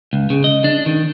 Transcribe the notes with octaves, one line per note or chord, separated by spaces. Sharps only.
C#2
C#3
D#5
D4
D#3